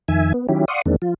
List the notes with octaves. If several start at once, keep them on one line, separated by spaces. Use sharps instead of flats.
F2 D#3 E5 G#5
B3
D#3 F#3 C#4 E4 G4
D5 F5 F#5 C6 C#6 D#6
E2 D#3 G#3 A#3 C4 D4
F3 F4